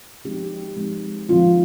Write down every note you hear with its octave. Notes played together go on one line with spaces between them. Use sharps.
F3 G#3 C4 D#4 G4
F3 G#3 C4 D#4
F3 G#3 C4 D#4 F4